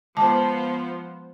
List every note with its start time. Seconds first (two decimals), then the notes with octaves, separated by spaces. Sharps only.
0.17 F3 G#3 B3 C5 A5 D6